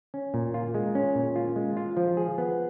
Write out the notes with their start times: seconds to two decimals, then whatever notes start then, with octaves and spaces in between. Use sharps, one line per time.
0.14 C#4
0.34 A#2
0.54 F4
0.74 G#3
0.95 C#4
1.15 A#2
1.36 F4
1.56 G#3
1.77 F4
1.97 F3
2.17 G#4
2.38 B3